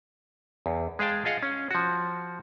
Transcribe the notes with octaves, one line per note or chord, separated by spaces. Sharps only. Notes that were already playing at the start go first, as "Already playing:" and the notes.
E2
G#3 G#4 F5 G5 A5
F4 G#4 D#5 F5 F#5
C#4
F3 F#4